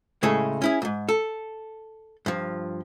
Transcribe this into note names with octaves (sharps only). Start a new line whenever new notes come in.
A2 C#3 G#3 E4 G#4 A4
C#4 E4 G#4
E2 G#2
A4
G2 F3